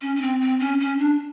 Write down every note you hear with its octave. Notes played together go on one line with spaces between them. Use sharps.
C#4
C#4
C4
C4
C#4
C#4
D4